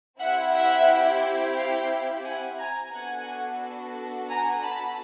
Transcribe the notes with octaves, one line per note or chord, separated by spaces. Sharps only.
C4 E4 G4 E5 F#5
E5 F#5
F5 G5
F#5 G#5
G#5 A#5
B3 D4 F#4 A4 F#5 G#5
G#5 A#5
A5 B5